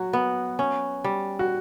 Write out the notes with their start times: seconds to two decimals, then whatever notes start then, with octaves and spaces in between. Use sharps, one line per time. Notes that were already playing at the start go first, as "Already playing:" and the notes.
Already playing: F#3 F#4
0.13 B3
0.59 C#4
1.04 G3
1.39 F#4